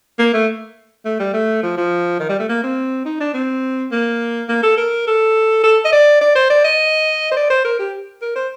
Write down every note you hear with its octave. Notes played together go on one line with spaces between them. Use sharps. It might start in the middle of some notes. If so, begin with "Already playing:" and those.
A#3
A3
A3
G3
A3
F3
F3
D#3
G3
A3
A#3
C4
D#4
D4
C4
A#3
A#3
A4
A#4
A4
A4
D#5
D5
D5
C5
D5
D#5
C5
D5
C5
A#4
G4
A#4
C5